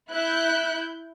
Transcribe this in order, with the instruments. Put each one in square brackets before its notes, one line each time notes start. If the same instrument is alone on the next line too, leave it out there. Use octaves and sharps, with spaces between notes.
[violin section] E4 F#6 G6